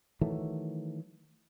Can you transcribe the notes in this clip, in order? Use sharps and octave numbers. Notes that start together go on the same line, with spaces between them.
D#3 E3 F#3 A3